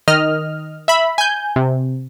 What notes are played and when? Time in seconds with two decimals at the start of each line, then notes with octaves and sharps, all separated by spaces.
0.08 D#3 D#5 F6
0.88 E5 B5
1.18 G#5 G6
1.56 C3